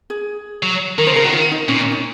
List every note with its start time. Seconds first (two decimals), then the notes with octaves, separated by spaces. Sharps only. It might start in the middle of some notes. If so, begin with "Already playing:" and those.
0.10 G#4
0.63 F#3
0.98 D#3 A#4
1.07 C5
1.11 C#3 A#4
1.24 D#3 F#4
1.33 F4
1.51 D#4
1.68 A#2 C#4
1.80 C#4
1.92 D#4